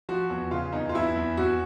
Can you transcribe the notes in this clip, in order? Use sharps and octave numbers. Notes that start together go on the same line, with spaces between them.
F3 F#4
E2
C#3 F4
E2 D#4
F4
E2 E4
E2
E2 F#4